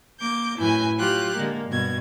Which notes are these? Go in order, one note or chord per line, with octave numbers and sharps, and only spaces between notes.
A#3 D6 G6
F#2 A2 E4 B4 G#5 G6
F#3 F4 G4 F#6
D3 G#3 A#3
G2 B2 G#6